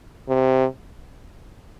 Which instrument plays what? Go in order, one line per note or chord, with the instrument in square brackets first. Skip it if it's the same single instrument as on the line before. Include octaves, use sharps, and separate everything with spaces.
[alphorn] C3